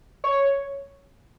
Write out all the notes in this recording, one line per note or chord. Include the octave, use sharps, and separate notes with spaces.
C#5